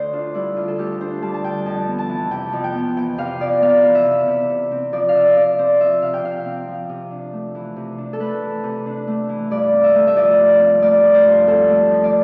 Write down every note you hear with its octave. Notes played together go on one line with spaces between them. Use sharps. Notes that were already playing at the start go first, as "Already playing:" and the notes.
Already playing: D2 D3 A4 C5 D5
D4 F4
G3 E4
D3 F4
A4
D2 G4
D4 C5
G3 A5
A5
D3 G5
F2 A5
B3
A5
E3
C3 G5
F2
G5
B3
E3 G5
C3 F5
F2 D5
B3 F5
E3
E5
C3
C3
C3
C4
F3 D5
F5
C3 E5
C3 D5
C4 C5
F3 E5
C3 F5
G5
C3 F5
C4
F3
C3
D4
A3
E3
C3
D4
A4
A3 B4
E3
C3
D4
A3
E3
G2 D5
C4
E5
A3
E5
F3 D5
G2
C4
A3 D5
F3
C5
G2
C4 A4
A3
F3
D5